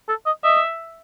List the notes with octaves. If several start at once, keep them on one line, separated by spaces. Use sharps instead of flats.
A4
D#5
D#5 E5